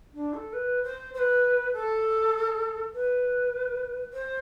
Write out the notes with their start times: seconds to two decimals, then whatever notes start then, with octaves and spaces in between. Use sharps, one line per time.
0.14 D4
0.34 A4
0.53 B4
0.83 C5
1.14 C5
1.19 B4
1.73 A4
2.94 B4
4.13 C5